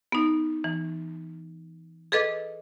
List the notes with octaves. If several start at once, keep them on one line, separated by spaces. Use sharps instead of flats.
B3 D#4
E3
G#4 A4 B4 D#5 D6